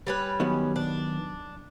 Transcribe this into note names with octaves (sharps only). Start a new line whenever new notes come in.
G3 C#4 B4
D#3 F#3 B3
D4